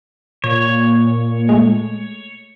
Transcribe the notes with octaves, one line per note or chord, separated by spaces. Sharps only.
A#2 C#5
G#3 A3